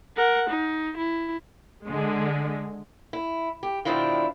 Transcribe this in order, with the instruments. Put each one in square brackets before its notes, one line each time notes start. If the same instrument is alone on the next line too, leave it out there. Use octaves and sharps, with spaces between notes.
[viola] A#4 F#5
D#4
E4
[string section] D3 G#3
[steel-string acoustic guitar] E4
G4
B2 D#3 C4 D4 E4 F4